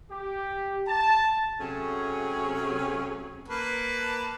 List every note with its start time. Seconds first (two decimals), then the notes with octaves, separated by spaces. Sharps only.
0.11 G4
0.88 A5
1.61 C3 F#3 A3 C#4 G#4
3.48 A#3 B4 A5